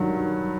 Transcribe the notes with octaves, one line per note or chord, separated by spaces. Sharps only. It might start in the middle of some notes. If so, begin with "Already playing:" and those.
Already playing: G2 D#3 F#3